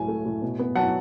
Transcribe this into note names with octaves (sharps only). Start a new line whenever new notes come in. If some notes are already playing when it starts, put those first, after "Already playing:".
Already playing: C#2 A2 F#3 G#5
A3
A2
B2
B3
F#3 F#5 A5